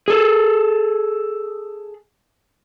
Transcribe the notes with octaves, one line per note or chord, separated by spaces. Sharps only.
G#4 A4